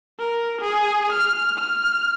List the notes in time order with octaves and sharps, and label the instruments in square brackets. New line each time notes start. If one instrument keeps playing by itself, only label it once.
[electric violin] A#4
G#4
F6
F6